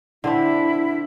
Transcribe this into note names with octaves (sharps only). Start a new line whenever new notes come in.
D3 C4 D4 E4